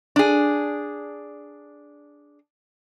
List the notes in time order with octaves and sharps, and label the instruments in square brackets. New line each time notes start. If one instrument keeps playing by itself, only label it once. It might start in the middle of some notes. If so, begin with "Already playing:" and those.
[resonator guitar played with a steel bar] D4 G#4